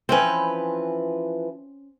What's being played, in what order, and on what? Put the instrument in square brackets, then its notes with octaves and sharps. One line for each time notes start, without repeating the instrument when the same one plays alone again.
[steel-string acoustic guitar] E3 F3 B4 [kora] C4 C#4